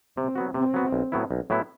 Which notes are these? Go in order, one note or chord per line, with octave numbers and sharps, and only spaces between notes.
C3 C4
F#3 B3 F#4
C3 C4
F#3 B3 F#4
B1
A2 F#3 B3 E4
B1
A2 F#3 B3 E4